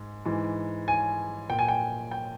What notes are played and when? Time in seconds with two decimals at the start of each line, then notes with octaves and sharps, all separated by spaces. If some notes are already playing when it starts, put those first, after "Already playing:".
Already playing: G#2
0.25 G#2 E3
0.88 G#5
1.50 A#2 G5
1.59 G#5
1.68 G5
2.11 G5